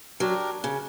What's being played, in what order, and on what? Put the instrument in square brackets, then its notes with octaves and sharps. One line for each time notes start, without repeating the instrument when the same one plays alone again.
[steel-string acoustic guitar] F#3 [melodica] D4 G4 A#4
[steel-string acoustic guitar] C#3